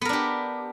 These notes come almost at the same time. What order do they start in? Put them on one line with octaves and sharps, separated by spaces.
B3 A#4 D4 G4